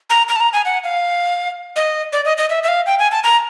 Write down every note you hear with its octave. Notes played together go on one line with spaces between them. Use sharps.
A#5
A#5
A5
A#5
G#5
F#5
F5
D#5
D5
D#5
D#5
E5
E5
F5
G5
G#5
A5
A#5